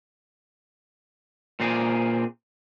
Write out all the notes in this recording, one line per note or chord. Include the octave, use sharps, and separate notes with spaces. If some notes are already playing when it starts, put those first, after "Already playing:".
A#2 C4 G#4